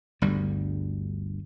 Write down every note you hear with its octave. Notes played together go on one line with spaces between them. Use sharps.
G1 D2 G3